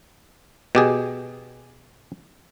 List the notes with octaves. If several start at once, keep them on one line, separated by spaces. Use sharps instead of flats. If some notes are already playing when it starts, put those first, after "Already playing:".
B2 G4 G#4